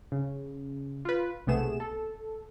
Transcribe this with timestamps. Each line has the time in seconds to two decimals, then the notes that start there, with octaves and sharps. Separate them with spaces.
0.12 C#3
1.05 F4 B4
1.47 B1 C3 A3 B3 G#4 E7
1.80 A4